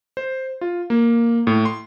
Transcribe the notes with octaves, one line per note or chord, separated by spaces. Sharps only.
C5
F4
A#3
A2
C6